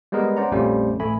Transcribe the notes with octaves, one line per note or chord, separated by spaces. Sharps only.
G3 G#3 B3 A#4 B4 D#5
C#4 C5 D5 F#5 A#5
A#1 F2 G3 A3 C#4 C5
A1 A3 G#5 B5